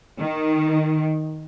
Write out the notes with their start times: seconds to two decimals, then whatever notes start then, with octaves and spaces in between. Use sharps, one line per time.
0.19 D#3